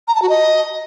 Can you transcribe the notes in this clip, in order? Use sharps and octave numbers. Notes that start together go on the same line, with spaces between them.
A#5
A5
F#4
D#5